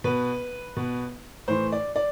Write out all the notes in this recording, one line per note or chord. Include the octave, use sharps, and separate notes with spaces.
B2 B4
B2
A2 E3 C5
D5
D5